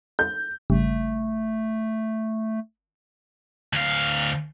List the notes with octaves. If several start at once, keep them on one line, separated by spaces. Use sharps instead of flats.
G6
G#1 C#3 G3 A3
D2 F5